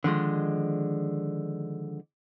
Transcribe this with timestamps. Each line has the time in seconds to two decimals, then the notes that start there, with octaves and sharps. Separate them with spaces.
0.04 D3 D#3 F3 G#3